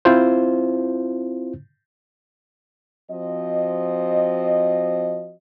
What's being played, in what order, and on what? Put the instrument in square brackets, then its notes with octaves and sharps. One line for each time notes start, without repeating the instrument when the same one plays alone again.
[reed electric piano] C4 E4 F4 C5
[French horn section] F3 C4 F#4 D#5